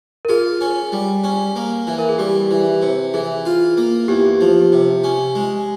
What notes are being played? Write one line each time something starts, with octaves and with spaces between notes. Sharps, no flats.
A#4
F4 G#4
C#4
G3
C#4
A#3
E3
A#4
G#4
G3 G4
E3
C3
E3 G#4
F4
A#3
E2 G4
F3
C3
C#4
G#3